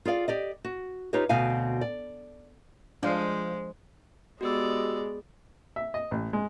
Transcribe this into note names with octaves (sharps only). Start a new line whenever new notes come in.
F4 G#4 D5 F5
G4 D5 D#5
F#4
D#4 F4 G4 B4 C#5 D#5
D2 B2 C4 F5 G#5
D5
F3 G#3 D4 F5
G#3 B3 F#4 G4 D5 E6
E5
D#5
A1
G#3